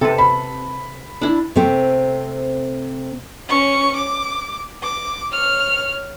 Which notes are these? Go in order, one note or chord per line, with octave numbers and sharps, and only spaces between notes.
C3 A4 B4
B5
D4 E4
C3 A3 C4
C#4 C#6
D6
D6
C#5 F6